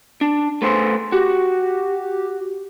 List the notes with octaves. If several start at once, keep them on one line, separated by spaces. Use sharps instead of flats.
D4
A3 B4 C5
F#4 G4